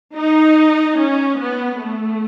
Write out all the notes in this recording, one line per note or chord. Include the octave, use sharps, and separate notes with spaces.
D#4
C#4
B3
A3